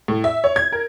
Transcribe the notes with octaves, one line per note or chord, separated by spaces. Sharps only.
A2
E5
C#5
G#6
A#4